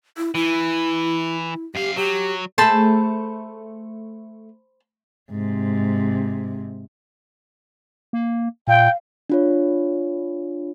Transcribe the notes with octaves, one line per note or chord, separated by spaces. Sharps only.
E4
E3 E4
F#2 G4 F5
F#3 G4
A3 G#4 C5 A5 B5
G#2 C3
A#3
A#2 F5 G5
D4 F4 C#5